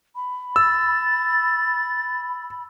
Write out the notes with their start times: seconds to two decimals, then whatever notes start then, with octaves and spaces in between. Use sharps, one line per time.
0.15 B5
0.56 E6 A6